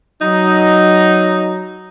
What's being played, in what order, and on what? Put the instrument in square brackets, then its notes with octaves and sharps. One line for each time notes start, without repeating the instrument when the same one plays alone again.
[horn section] F#3 D#4